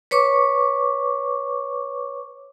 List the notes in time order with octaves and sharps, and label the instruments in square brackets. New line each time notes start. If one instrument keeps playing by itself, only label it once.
[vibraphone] B4 C#5 C#6 D6